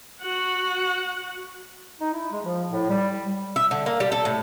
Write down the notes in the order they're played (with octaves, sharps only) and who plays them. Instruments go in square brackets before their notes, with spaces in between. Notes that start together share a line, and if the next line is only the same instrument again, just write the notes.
[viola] F#4 F#5
[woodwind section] D#4
E4
G#3
F3
A2
G3
[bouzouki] E5
D3
A#3
G3
A4
A2